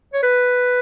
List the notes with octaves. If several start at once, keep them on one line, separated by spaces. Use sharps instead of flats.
C#5
B4